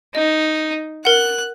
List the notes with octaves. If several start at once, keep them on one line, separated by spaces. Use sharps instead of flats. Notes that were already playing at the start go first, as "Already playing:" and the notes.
D#4 D#5
A#4 F#5 F#6